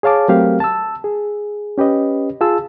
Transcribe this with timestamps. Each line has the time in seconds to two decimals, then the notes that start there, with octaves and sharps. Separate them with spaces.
0.03 G#4 C#5 F5 A5 D6
0.28 F#3 A3 C4 G4 A#4 F5
0.60 A5 E6
1.04 G#4
1.78 C#4 G4 B4 D#5
2.41 F4 G#4 A5 E6